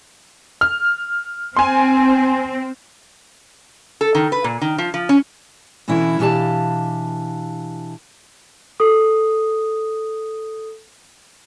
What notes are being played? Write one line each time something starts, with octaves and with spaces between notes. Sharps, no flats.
F6
C4 G#5 C6
A4
D#3
B4
A#2
D#3
F3
F3
C#4
B2 D3 E3 C#4 E4
B2 E3 D4 G4 F5 A5
A4 D#6